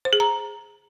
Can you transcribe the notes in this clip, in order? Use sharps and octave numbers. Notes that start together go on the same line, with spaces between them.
C5
G#4
A#5